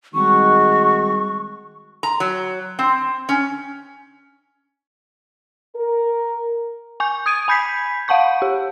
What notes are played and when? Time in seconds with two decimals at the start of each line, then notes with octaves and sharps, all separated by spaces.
0.15 D#3 G3 G#3 C4 F#4 C#6
2.03 A#5
2.20 F#3
2.79 C4
3.29 C#4
5.76 A#4
7.00 G#5 C#6 G6
7.26 D#6 G#6 D7 D#7
7.48 G#5 B5 G6 G#6 B6 C7
8.08 F5 F#5 A5 C#6 G6
8.42 G4